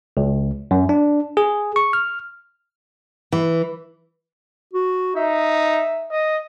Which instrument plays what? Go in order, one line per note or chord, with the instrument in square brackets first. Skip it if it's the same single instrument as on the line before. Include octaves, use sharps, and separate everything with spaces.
[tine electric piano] C#2
F#2
D4
G#4
C#6
F6
[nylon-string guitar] E3
[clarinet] F#4
[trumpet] D#4 [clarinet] E5
[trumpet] D#5